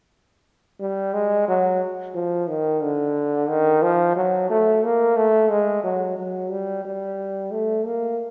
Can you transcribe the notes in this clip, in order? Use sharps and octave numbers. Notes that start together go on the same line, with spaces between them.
G3
G#3
F#3
F3
D#3
D3
D#3
F3
F#3
A3
A#3
A3
G#3
F#3
F#3
G3
G3
A3
A#3